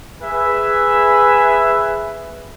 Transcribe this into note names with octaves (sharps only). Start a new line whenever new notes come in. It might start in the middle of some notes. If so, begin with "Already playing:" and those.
G#4 B4 E5 G#5